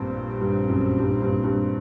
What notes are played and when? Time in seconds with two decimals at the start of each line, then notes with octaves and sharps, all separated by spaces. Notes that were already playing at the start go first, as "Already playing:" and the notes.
Already playing: A#1 G2 A#2 G3 C4
0.41 G2
0.69 F#2
0.99 G2
1.22 G2
1.44 G2